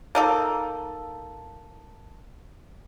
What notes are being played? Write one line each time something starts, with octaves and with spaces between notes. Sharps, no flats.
A#3 D#4 A4